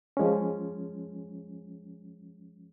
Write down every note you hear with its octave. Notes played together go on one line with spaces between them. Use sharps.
F3 G#3 C#4